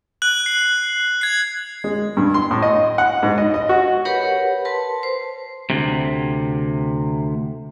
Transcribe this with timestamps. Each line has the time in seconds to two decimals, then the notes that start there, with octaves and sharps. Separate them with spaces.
0.22 F#6 F#7
0.46 C7
1.21 G#6 C7
1.84 G#3
2.17 G2
2.34 C6
2.51 A2
2.62 D#5
2.98 F#5
3.23 G#2
3.38 D#5
3.54 D#5
3.69 F#4
4.05 G4 A#4 B4 C#5 F#5 B5
4.65 A#4 B4 A5 C6
5.03 C5
5.70 D2 C3